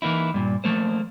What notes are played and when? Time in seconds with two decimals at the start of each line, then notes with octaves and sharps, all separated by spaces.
0.02 E3 A#3 D#4 E4
0.34 G2 A#2
0.64 F3 A3 A#3 C5